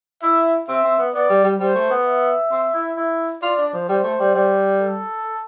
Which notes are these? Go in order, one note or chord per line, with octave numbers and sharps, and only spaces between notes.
E4 E5
C4 E5
C4
B3
B3 D5
G3
G3
G3 C5
A3
B3
E5
C4
E4
E4
F4 D5
D4
F3
G3 C5
A3
G3
G3
A4